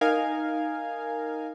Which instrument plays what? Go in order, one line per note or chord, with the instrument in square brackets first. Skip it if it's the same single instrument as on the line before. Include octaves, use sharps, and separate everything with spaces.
[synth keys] D#4 A#4 F5 G#5